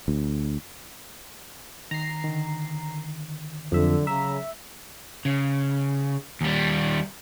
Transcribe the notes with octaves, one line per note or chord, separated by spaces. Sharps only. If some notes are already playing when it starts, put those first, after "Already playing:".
D2
D#3 A#5 C7
D3 D#3
F2 D3 F#3 E5
C#3 E5 A#5
C#3
D#2 G3